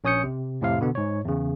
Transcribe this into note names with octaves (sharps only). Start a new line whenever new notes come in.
A#1 C#4 C#5 D#6 G6 C#7
C3
F2 A2 C3 F5
B2 D3 B3
G#2 C#5
E2 C#3